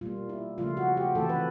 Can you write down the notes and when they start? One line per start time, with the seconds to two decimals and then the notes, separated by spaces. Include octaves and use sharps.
0.01 B2 G3 A#3 F4
0.29 E4
0.58 C#3 F3 A3 F4
0.77 F#4
0.97 G4
1.15 C3 E3 A3 A4
1.29 B4